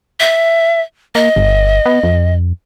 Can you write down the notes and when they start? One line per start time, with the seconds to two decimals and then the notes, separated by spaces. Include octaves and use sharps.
0.20 E5
1.15 A#3 D#5
1.36 G1
1.86 B3
2.03 F2